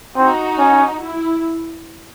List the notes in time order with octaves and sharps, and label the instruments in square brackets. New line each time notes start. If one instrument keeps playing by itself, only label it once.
[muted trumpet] C4 [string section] D#4 F#4
[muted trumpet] C#4
[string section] E4